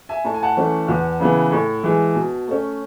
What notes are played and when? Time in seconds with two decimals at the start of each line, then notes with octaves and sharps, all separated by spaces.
0.09 E5 G#5
0.25 A2 A5
0.34 G#5
0.43 F#5 A5
0.57 E3 A3 C#4
0.88 E2
1.20 C#3 E3 B3
1.52 A2
1.83 E3 G#3
2.15 B2
2.48 A3 C#4